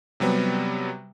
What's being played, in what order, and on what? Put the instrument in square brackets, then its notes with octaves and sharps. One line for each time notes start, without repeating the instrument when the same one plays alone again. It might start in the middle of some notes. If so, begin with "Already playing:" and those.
[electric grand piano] C3 F#3 G3 B3